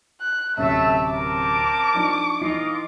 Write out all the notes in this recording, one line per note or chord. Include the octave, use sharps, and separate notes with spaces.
F#6
D1 C3 A3 C#4 E5 A5
C4 A#4 A5 D6
F3 D4 D#4
E3 D#4 F4 D#5 C7